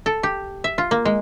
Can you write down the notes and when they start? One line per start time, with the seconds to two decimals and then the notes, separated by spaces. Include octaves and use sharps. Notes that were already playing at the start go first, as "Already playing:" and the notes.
0.06 A4
0.23 G4
0.64 E5
0.78 F4
0.91 A#3
1.05 G#3